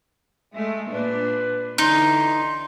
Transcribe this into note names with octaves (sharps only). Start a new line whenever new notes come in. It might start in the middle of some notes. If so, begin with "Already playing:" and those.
G#3 A3 E5
A#2 D4 B4
D3 E3 D#4 C6